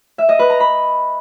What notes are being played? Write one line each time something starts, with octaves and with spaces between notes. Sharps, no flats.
E5
D#5
B4
A#5
B5